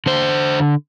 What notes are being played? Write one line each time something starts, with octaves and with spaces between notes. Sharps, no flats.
D3 C5